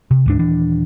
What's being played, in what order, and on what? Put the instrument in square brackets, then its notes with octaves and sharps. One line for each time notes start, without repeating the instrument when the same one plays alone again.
[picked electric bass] C3
D2 G#2 D4
D#1 E3 D4